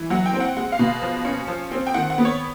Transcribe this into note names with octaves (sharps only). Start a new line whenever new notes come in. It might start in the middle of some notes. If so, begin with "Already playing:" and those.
Already playing: E3
F#3 F#5
G5
C4
F#5
G#3 F#5
F5
B2
F5
F3
C#4
F3
C4
G5
D#3 F#5
F#5
B3
C#5